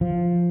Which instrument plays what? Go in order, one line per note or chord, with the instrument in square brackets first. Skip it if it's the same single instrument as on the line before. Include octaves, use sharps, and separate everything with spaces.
[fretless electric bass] F3